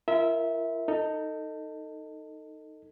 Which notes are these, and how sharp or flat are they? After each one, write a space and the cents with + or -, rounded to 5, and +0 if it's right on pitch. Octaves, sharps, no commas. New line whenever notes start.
F4 -45 A#4 +0 E5 -20
D#4 +0 A4 +25